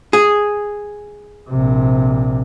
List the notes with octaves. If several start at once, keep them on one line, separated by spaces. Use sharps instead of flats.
G#4
A#1 C3